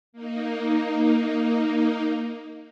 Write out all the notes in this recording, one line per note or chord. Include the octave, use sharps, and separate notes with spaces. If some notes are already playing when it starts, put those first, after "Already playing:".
A#3 D#4